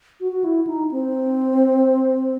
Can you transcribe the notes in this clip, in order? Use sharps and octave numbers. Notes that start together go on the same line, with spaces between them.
F#4
F#4
E4
D#4
C4